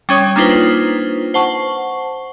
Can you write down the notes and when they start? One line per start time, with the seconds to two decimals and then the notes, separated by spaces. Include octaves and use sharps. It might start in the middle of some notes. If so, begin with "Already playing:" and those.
0.09 G3 C#4 C#5 D#6
0.36 A#3 D4 D#4 F4 B4 C5
1.34 C5 F#5 A5 C#6